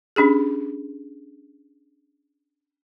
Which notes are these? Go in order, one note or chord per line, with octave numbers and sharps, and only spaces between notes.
C#4 D4 G4 G#4